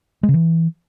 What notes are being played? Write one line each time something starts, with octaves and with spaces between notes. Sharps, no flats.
G#3
C#3
E3